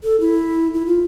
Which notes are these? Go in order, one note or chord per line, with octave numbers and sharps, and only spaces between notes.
A4
E4
E4
F4